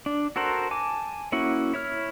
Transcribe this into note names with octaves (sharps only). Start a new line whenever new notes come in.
D4
F#4 A4 A#4 C5 F#5
G#5 A5 D6
A#3 C#4 E4 F#4 F#5
E4 C#5 F6